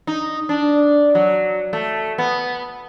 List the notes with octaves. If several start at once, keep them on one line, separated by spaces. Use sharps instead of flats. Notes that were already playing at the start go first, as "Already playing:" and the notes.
D#4
D4
F#3
A3
B3